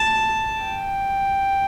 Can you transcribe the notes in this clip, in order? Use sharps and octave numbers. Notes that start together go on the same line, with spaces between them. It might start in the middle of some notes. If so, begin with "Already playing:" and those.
Already playing: A5
G5